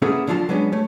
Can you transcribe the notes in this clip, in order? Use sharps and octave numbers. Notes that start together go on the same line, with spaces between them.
A#3 B3 C#4 E4 G#4 A4
D3 F3 F#3 F4 A5
F#3 G#3 B3 C#4 D4
A3 C#5